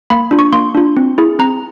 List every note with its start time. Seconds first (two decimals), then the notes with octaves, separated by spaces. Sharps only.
0.10 A#3 B5
0.31 D4 F4
0.39 C#6
0.53 A#3 C6
0.75 D4 F4
0.97 C4
1.18 E4 G#4
1.39 C4 A#5